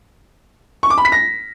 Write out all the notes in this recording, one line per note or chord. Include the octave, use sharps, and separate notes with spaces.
C#6
D6
B5
B6
A#6